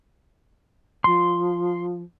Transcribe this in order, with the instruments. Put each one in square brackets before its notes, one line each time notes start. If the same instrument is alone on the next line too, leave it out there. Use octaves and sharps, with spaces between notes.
[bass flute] F3 [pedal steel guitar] C6